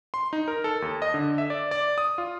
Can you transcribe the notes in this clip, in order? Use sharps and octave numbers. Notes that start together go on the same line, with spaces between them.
C6
D#4
A#4
A4
D#2
D#5
D3
E5
D5
D5
D#6
F4